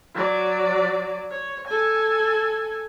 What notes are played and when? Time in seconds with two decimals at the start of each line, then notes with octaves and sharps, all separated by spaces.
0.15 F#3 D5
1.31 C#5
1.67 A4 G#5